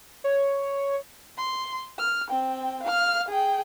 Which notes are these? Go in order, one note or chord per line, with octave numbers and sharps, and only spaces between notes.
C#5
C6
F6
C4 G5
F5 F6
G#4 G5